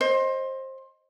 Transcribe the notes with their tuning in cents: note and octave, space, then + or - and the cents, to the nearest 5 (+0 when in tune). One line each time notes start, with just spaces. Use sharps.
C5 +20 D#5 +5